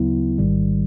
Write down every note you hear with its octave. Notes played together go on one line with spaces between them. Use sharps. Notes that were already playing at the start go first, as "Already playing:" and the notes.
Already playing: D2 C#3 F#3 B3 E4
A1 G#2 D#3 G3